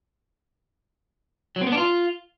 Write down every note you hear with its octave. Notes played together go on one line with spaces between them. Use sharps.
F#3
C4
B3
D4
F4